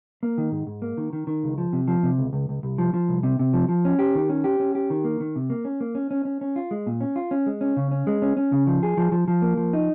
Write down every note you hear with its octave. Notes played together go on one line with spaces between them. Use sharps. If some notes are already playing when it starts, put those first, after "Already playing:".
A#3
D#3
G#2
G#2
A#3
D#3
D#3
D#3
C#2
F3
C3
F3
C3
C#2
C#2
C#2
C2
F3
F3
C2
C3
C3
F3
F3
C#4
G4
D#3
C#4
G4
C#4
G4
D#3
A#3
D#3
C3
A#3
C#4
A#3
C#4
C#4
C#4
C#4
F4
G#3
A#2
C#4
F4
C#4
G#3
C#4
C#3
C#4
G#3
C#4
C#4
C#3
F3
G#4
F3
F3
F3
A#3
F3
D#4